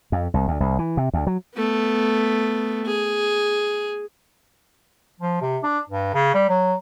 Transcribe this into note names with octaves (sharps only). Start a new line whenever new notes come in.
F2
C2
D2
C2
E3
C3
D2
F#3
A3 B3
G#4
F3
C3
D4
G2
C#3
G3
F#3